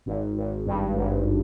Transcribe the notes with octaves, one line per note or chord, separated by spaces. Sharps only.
G#1
G#1
G2
G#1